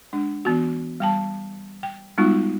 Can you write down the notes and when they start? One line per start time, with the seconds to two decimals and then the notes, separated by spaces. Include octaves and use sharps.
0.13 G#3 D4
0.45 E3 B3 F#4
1.00 G3 G5 A5
1.83 G5
2.18 G3 G#3 B3 D#4 F4 F#4